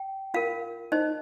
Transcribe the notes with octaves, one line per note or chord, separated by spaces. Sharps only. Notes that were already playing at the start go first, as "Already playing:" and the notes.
Already playing: G5
F4 A#4 F5
D#4 C5 D#5